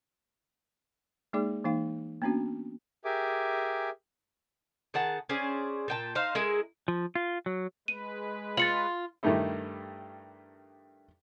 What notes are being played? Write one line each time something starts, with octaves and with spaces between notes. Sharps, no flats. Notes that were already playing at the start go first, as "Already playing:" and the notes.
G#3 A#3 D#4 G#4 D5 D6
E3 A#3 D#4 F5
A#3 B3 C#4 D4 F#4
G4 G#4 A#4 E5 G#5 D6
D#3 G#4 F#5 A5
C#4 G#4 C5 D5
A#2 G5 A5
D#4 C5 F5
G#3 E4 G#4 A#4
F3
F4
F#3
G#3 B4 D#7
F4 A6 C#7 F#7
G2 D#3 G3 A3 D#4 E4